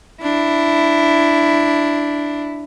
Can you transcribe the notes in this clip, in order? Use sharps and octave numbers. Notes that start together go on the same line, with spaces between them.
D4 E4